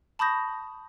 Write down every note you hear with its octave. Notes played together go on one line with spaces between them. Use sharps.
A5 B5 C#6 D#6 G6 A#6